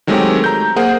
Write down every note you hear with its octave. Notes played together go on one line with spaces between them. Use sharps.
D#3 F#3 G#3 A3 C4 G4
A#5 G6
A#3 G#4 C5 F#5 G#5